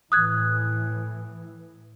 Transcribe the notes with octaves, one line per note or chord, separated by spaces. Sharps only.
A2 E3 D#6 F#6 G#6